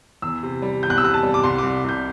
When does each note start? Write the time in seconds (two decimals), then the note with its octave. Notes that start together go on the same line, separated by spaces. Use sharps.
0.22 E2 E6
0.43 C3
0.62 G3
0.83 E2 G6
0.90 F#6
0.98 E6
1.03 C3 F#6
1.14 A5
1.23 G3
1.34 D6
1.43 C2 C6
1.58 C2 D6
1.84 C2 G6